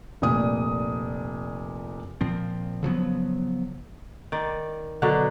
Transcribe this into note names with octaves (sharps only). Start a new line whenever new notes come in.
F1 A#2 D#6
A#2 F3 C4
C#3 F3 F#3 B3
D#3 D5
B2 D3 F#3 D4